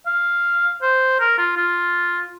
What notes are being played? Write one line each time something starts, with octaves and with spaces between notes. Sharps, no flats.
F5
C5
A#4
F4
F4